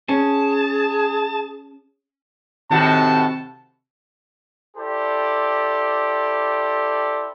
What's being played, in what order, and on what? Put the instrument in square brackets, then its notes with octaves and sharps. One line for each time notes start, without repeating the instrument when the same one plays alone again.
[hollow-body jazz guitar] C#4 [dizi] G#4 [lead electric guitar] A5
[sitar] A2 D#3 F#4 [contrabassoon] C3 [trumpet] A5
[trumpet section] E4 G4 A4 C5 D5